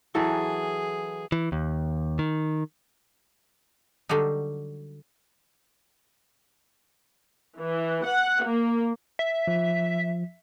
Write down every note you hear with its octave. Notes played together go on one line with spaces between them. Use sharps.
E3 F#3 G#4 A4
E3
D#2
D#3
D3 F#3 G3 D#4
E3
F#5
A#3
E5
F3